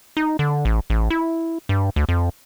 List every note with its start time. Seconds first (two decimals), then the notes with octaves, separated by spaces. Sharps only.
0.17 D#4
0.39 D3
0.65 A1
0.90 A1
1.10 E4
1.69 G2
1.96 D2
2.09 F2